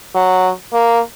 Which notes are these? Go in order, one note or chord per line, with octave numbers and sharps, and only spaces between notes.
F#3
A#3